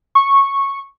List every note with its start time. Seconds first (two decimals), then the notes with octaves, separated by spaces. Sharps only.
0.15 C#6